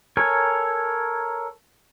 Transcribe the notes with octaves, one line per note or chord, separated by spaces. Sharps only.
A4 A#4 C#5 G#5